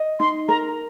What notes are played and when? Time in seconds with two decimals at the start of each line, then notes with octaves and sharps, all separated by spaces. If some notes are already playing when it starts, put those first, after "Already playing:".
Already playing: D#5
0.20 D#4 C6
0.48 A#4 A#5